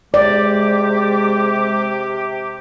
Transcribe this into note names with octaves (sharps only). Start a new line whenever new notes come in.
C3 G#3 G4 D5 D6